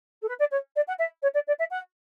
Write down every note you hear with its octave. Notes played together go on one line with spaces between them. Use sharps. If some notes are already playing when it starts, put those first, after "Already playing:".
A4
B4
D5
C#5
D5
F#5
E5
C#5
D5
D5
E5
F#5